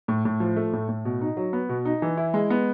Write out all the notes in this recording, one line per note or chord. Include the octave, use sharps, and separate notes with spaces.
A2
A2
F3
A3
A2
A2
B2
D#4
F#3
B3
B2
D#4
E3
E4
G#3
B3